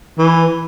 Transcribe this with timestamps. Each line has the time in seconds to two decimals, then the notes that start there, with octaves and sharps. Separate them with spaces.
0.18 E3